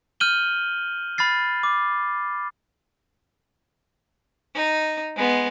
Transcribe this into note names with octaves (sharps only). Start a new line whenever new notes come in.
F6 G6 D#7 F#7 G7
B5 F6 A6 C7
D6
D#4
G#3 B3